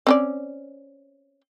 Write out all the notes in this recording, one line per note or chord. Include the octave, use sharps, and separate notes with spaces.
C4 C#4 D5